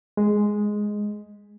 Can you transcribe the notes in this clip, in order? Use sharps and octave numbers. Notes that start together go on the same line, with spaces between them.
G#3